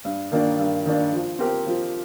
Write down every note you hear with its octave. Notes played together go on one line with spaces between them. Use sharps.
G2
D#3 A#3 D4
G2
D#3 A#3 D4
F3
C4 G4 A#4
F3